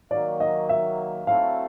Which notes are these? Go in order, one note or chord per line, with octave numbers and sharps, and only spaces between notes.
D#3 F#3 A#3 D5
D#5
E5
F#3 A3 C4 E4 A4 F5